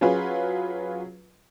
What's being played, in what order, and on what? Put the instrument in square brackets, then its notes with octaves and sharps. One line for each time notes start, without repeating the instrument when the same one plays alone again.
[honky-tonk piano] F#3 C#4 F4 G#4 B4